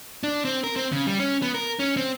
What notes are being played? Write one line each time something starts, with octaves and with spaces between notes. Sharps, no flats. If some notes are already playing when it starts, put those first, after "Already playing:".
D4
C4
A#4
C4
C#3
G3
C#4
B3
A#4
C#4
C4